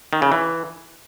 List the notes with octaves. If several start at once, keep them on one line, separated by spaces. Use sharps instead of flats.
D#3
C#3
E3